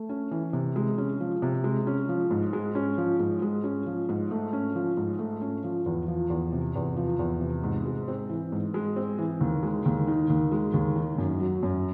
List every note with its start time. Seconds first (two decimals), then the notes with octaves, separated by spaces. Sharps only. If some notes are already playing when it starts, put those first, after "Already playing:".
Already playing: A3
0.09 C#4
0.31 E3
0.53 C3
0.76 G#3
0.98 C#4
1.20 F3
1.42 C3
1.64 G#3
1.87 C#4
2.09 F3
2.31 G#2
2.53 G#3
2.75 C#4
2.98 F3
3.19 G#2
3.42 G#3
3.64 C#4
3.86 F3
4.09 G#2
4.31 A3
4.53 C#4
4.75 F3
4.97 G#2
5.19 A3
5.42 C#4
5.64 F3
5.86 E2
6.08 F3
6.30 E2
6.53 C3
6.75 E2
6.97 F3
7.19 E2
7.41 C3
7.63 G#2
7.86 G#3
8.08 C4
8.29 E3
8.52 G#2
8.74 G#3
8.96 C4
9.18 E3
9.41 D#2
9.63 G#3
9.85 D#2
10.08 D#3
10.30 D#2
10.52 G#3
10.74 D#2
10.96 D#3
11.18 F#2
11.40 F#3
11.63 F#2